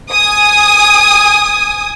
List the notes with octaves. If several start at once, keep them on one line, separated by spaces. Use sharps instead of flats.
G#5 D#6